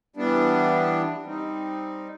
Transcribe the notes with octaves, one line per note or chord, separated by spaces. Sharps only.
E3 G3 B3 D4
G3 C4 D#4